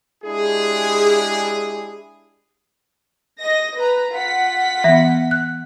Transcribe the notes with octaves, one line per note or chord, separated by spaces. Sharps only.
G#3 D4 E4 G4 G#4
D#5 A#6
B4 A#5
F4 F#5 B6
E3 B3 E5
F#6